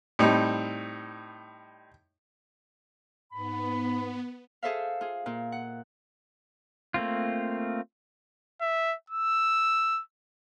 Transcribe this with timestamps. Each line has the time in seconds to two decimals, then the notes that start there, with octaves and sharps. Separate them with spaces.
0.19 A2 G3 C4 D#4
3.33 G#2 B3 B5
4.63 G#4 A4 C5 E5 F5
5.01 F4 G#4
5.26 A#2 F4
5.52 F#5
6.94 A3 A#3 C4 F4
8.62 E5
9.10 E6